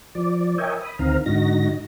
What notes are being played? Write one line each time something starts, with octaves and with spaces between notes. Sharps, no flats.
F3 D5
A#4 C#5 D#5 E5 G5 G#5
B5 D#6
D2 D#3 C4 F5 A#5
G#2 D3 D#4 F#4 A#6